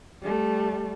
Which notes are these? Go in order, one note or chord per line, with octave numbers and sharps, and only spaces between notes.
G3 A3